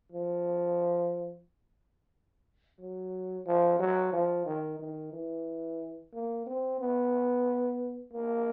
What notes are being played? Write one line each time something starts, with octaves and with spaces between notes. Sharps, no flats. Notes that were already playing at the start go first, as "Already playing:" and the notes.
F3
F#3
F3
F#3
F3
D#3
D#3
E3
A#3
C4
B3
A#3